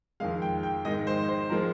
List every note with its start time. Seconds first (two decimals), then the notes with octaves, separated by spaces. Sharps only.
0.20 F2 D#3 G#3 F5
0.42 G5
0.63 G5
0.85 G#2 D#3 G#3 D#5
1.07 C5
1.28 C5
1.50 F3 G#3 A#4